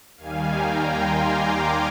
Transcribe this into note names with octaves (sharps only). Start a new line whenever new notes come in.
D#2 D#3 G3 F5 G#5
G5 A#5
G#5 C6
A#5 D6